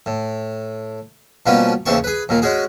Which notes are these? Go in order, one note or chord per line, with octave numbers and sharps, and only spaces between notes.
A2
B2 F3 G3 A#3 B3 C#4
D#2 C#3 E3 C4 A5 C#6
G#4 B4
D#2 A#2 A#3
G#3 C#4 F#4 G#4